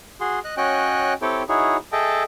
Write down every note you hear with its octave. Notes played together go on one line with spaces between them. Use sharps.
F#4 G#4 C6
D#5 F#6
C#4 F#4 C#5 D#5 G5 F#6
C4 E4 G4 A4 C#5 G5
D#4 E4 F#4 G#4 C#5
G#4 A4 D#5 E5 G5 A5